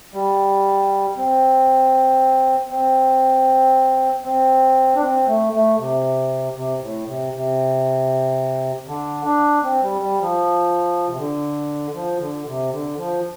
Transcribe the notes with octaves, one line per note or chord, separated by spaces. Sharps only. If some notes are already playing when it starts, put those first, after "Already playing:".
G3
C4
C4
C4
D4
C4
A3
A3
C3
C3
A2
C3
C3
D3
D4
C4
G3
G3
F3
C3
D3
F3
D3
C3
D3
F3